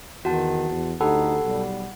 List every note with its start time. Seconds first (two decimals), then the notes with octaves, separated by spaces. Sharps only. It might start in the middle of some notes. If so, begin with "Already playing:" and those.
0.25 E2 D#3 F#4 F#5 A5
0.70 E2
1.01 D2 D#4 G4 A4 F#5 B5
1.44 B1 G3